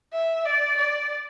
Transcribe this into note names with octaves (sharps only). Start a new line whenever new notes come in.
E5
D5
D5